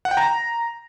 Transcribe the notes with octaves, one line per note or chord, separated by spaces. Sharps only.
F#5
G5
A#5